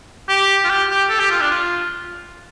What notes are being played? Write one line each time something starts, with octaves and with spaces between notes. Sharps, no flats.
G4
F4
G4
G4
A4
G4
F4
D4
F4